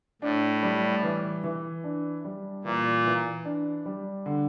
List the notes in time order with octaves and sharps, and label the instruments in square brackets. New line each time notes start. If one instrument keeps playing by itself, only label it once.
[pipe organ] A2 [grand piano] D4
[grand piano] G3
E3
E3
D4
G3
[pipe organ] A#2 [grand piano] E3
[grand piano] E3
D4
G3
D3